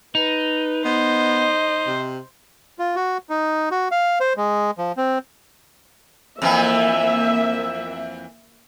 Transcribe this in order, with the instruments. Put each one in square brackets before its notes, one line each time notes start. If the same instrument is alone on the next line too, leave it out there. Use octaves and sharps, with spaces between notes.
[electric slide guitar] D#4 [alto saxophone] B4
[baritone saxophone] B3 [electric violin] C5 [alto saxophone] D#5
[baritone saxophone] C3
[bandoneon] F4
F#4
D#4
F#4
F5
C5
G#3
F3
C4
[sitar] F2 E3 [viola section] A#3 E5